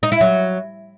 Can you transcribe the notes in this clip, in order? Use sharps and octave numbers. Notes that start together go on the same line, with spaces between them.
D#4
E4
F#3